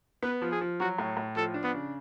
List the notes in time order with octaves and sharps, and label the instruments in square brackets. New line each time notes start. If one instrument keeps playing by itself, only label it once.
[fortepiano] B3 [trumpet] B4
[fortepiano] F3
[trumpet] G#4
[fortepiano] F3
[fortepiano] F#3 [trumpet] F#4
[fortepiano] A2
A2
[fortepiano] F3 [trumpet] A4
[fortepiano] D4
[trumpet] B3
[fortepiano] C#3